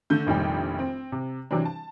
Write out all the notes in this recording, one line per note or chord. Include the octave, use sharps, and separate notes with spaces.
D3 A3 G6
F1 A#1 D#3 G3 G5
C4
C3
C3 E3 F#3 C4 D4
A5